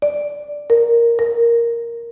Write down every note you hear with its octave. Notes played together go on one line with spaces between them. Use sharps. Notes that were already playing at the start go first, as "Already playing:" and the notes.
D5
A#4
A#4